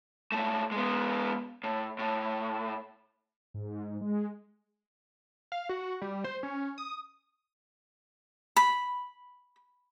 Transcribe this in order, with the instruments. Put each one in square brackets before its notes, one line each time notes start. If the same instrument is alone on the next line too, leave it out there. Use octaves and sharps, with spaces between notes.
[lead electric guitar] A#2 A3
G#3 B3
A2
A2
[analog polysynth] G#2
G#3
[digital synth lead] F5
F#4
G3
C5
C#4
D#6
[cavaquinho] B5